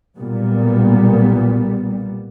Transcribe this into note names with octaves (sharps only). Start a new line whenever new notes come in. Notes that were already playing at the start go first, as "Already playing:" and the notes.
B1 A#2 G3 B3